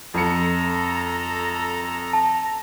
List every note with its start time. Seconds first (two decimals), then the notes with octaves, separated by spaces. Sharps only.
0.14 F2 A4 A#5 C#7
2.13 A5